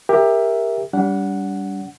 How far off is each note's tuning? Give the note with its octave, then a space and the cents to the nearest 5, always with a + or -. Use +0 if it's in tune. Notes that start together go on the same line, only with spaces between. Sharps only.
G4 +20 A#4 +0 E5 +0
G3 +0 D4 -40 F#5 +0